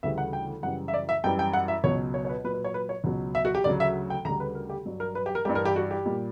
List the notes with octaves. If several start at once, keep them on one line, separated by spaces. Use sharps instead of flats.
D2 C#3 E3 G3 E5
F#5
G5
F#2 C#3 E3 G3 F#5
E5
D5
E5
F#2 E3 G3 G5
G5
F#5
E5
C#2 B2 F#3 C#5
C#5
C#5
B4
A#2 F#3 B4
B4
C#5
B4
C#5
C#2 B2 F#3
E5
F#4
G4
D2 C#3 F#3 D5
E5
G5
D2 C#3 G3 A#5
B4
A#4
G4
G2 F#3
A#4
B4
G4
A#4
G2 E3 G3 G4
A#4
G4
F#4
G4
A#2 G3